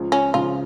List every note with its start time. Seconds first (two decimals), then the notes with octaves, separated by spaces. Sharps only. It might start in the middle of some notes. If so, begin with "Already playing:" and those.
Already playing: C#2 C#3 F3
0.12 C#4
0.34 C#2 C#3 F3 F4